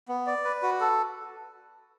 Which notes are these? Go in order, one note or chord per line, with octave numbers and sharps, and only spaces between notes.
B3
D5
B4
F#4
A4